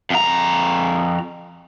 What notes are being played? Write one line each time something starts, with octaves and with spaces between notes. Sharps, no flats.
F2 A#5